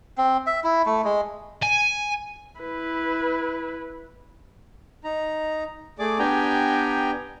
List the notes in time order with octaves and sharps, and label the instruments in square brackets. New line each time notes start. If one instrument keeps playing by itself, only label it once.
[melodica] C4
E5
E4
A3
G#3
[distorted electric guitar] G#5
[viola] E4 B4
[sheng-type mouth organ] D#4 A#5
A3 G#4 D5 D6
B3 D4 G4 G5 G#5 A#5